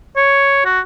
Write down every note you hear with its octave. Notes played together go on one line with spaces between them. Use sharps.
C#5
F#4